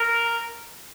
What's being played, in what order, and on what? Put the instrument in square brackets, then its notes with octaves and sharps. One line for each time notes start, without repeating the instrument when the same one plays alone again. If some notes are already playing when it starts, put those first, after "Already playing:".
Already playing: [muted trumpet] A#4